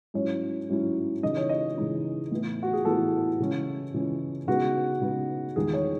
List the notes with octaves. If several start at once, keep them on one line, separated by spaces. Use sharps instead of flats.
G#2 F#3 C#4 E4 C#5
G#2 F#3 C#4 E4
C#3 E3 G#3 D#4 D#5
C#5
D#5
C#3 E3 G#3 D#4
A2 E3 B3 E4
F#4
G#4
A2 E3 B3 E4 A4
C#3 E3 G#3 C#4 E4
C#3 E3 G#3 C#4 E4
C#3 G#3 B3 D#4 F#4
C#3 G#3 B3 D#4
E2 D#3 G#3 G#4
C#5